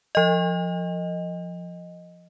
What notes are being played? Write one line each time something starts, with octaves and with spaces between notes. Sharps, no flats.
F3 D#5